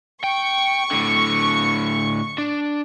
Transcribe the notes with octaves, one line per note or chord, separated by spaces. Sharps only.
G5 C#6
A2 D3
D4